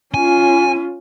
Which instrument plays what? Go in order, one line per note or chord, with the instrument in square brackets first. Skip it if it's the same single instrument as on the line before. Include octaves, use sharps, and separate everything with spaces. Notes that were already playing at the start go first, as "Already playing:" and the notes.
[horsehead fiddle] C#4 F4 [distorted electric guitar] G#5